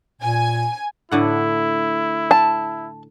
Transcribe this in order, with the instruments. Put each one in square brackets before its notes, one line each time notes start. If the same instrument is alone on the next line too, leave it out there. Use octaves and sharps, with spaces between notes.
[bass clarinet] A#2 [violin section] G#5
[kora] A2 D3 F#5 [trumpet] E4
[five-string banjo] A5